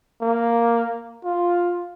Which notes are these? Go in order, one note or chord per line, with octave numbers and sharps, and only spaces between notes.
A#3
F4